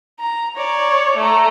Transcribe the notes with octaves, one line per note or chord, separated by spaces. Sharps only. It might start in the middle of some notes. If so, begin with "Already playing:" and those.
A#5
C#5 D5
A3 A#5